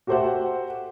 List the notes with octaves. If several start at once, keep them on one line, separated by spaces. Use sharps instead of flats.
F#4 G4 A4 C5 E5 F#5